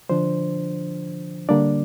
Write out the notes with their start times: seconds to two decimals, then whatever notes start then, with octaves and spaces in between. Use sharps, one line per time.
0.09 D3 F3 D4 C5
1.49 D3 G3 A#3 D4 D5